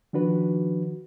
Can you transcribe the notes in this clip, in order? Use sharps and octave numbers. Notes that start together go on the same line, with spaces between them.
D#3 F3 D4 F#4 B4